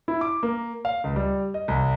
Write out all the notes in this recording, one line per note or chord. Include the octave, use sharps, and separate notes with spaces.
E4
D6
A#3
F5
C#2
G3
D#5
C2